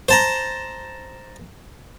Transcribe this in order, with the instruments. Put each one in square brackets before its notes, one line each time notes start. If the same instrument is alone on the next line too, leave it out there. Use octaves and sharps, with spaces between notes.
[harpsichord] C5 A5 A#5